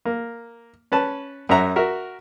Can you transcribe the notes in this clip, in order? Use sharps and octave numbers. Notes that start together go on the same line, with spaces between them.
A#3
C#4 B4 A5
F#2 C#4 E5 F#5 A#5
F#4 A#4 E5